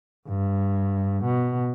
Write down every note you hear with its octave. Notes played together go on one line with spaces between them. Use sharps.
G2
B2